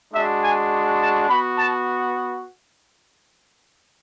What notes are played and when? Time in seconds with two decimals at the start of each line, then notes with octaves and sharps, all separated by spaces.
0.12 G#3 D4 F#4 E5
0.42 G#5
1.00 A5
1.29 B3 F#4 B5
1.57 A5